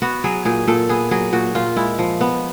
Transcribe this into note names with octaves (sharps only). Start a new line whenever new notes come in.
B3 F#4
F#3 G#4
A#2 G#4
A#2 A4
B3 G#4
F#3 G#4
A#2 F#4
A#2 F4
G#3 E4
F3
B3